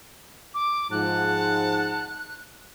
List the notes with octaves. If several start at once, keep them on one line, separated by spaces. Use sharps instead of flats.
D6
G#2 F3 F#5 A5 F#6